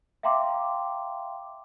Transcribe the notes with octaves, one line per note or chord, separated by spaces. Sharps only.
E5 F5 G5 A#5 C6 D6